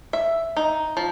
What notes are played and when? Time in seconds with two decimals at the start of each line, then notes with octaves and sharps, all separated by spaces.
0.13 E5
0.57 D#4
0.97 F3